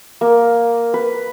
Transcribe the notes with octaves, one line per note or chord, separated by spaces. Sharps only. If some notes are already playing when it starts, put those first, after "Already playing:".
A#3
B4